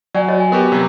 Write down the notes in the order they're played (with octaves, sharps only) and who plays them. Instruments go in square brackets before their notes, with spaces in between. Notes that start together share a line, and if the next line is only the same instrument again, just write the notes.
[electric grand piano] F#3 [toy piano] D5 F#5 G#5
[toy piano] F#4 C#5 D#5
G#5
[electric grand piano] B3 F#4 G4 [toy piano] A#4
[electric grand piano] C3 F#3